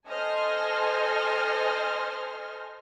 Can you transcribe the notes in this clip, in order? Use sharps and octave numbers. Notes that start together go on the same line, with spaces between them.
A4 C5 D#5 G#5 C6 F6